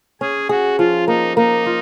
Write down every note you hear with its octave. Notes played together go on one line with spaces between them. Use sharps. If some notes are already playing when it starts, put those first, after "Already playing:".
C#4 G#4
F#4 G#4
F3 F4
A#3 D#4
A#3 D#4
F4